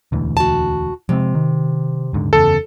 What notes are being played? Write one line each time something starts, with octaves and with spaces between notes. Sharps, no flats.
E1 D2 E3
F#4 A5
C3 F3 G#3 C4
D#3
D#1 G#2 D3
F#1 E2 C#3 A4